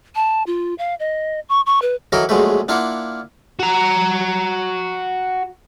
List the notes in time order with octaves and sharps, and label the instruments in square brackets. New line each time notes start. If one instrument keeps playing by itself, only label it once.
[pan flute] A5
F4
F5
D#5
C#6
C#6
B4
[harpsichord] E3 F#3 E4 A4 A#4 D#5
A#1 F#3 G#3 A3 B4
A#3 D4 E4 F4 F#5
[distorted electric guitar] F#4 A#5